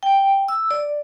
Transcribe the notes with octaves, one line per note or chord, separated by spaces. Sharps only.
G5
E6
D5